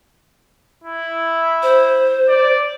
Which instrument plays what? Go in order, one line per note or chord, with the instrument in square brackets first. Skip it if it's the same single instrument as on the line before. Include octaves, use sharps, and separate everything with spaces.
[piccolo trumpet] E4
[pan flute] C5
[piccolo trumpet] D5